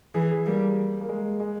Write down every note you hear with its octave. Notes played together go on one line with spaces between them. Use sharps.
E3 G#4
G#4
G3 A#3
A#3
G#3
G#3